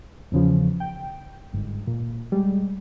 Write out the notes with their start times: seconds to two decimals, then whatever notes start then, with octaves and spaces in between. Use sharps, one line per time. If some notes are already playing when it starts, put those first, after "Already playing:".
0.32 E2 C#3 F3
0.80 G5
1.53 G1 G#2
1.87 A#2
2.32 G3 G#3